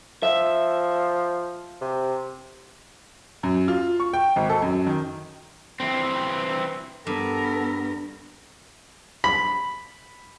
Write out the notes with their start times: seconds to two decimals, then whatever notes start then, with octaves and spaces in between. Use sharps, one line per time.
0.23 F3 E5
1.81 C3
3.43 F#2
3.68 F4
4.00 C#6
4.13 G5
4.36 G#1
4.49 A4
4.62 F#2
4.87 D#3
5.80 E3 C4
7.07 G2 B3 A4 A#4
9.24 B5